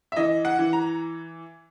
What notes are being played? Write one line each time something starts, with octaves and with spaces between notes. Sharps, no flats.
E5
E3 D#5
F#5
E3
A#5